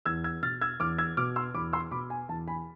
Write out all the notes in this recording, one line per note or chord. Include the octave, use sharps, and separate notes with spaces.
E2 E6 G#6
E6 G#6
B2 F6 A6
E6 G#6
E2 D6 F6
E6 G#6
B2 D6 F6
C6 E6
E2 B5 D6
C6 E6
B2 B5 D6
G#5
E2 A5
G#5 B5